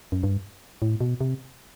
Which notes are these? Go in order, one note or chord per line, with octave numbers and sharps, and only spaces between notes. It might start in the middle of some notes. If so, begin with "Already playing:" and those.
F#2
G2
A2
B2
C3